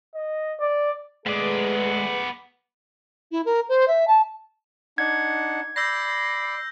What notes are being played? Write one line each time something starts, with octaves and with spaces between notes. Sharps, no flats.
D#5
D5
G#3 A3 B3 G#4 B4 D5
E4
A#4
C5
E5
A5
D4 D#4 F#5 G#6
D5 B5 E6 G6 A#6 C7